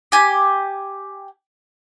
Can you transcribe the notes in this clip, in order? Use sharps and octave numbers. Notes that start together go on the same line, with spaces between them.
G4 G#5